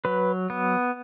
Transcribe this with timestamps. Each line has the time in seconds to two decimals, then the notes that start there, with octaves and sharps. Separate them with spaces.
0.05 F#3 B4
0.50 B3